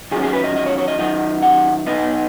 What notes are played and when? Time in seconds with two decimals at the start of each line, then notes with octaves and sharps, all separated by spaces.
0.11 D#3 G#4
0.15 F#3 C#4
0.23 G#4
0.33 B4
0.44 D#5
0.56 D#5
0.66 C#5
0.78 C#5
0.88 D#5
0.99 D#3 F#3 D#4 D#5
1.42 F#5
1.86 B2 B3 D#4 D#5